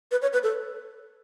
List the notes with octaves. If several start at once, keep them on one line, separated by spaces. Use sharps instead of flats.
B4
C#5
B4
A4